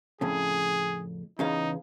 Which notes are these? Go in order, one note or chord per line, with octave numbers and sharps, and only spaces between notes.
F2 A2 C#3 G#4
E2 C#3 D#4 F5